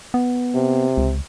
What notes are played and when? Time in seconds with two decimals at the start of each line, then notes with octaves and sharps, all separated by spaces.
0.14 B3
0.54 C3
0.97 C#2